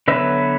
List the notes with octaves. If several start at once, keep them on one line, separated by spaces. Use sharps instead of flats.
D3 F#3 B3 B4 E5